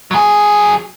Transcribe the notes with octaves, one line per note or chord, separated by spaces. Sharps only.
F#3 G#4